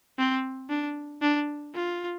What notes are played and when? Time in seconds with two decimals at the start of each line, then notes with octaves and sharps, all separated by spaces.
0.18 C4
0.70 D4
1.22 D4
1.75 F4